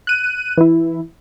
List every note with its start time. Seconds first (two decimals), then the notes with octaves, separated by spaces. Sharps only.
0.07 F#6 D#7
0.58 E3 E4